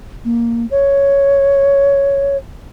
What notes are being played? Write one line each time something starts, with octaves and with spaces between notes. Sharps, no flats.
A#3
C#5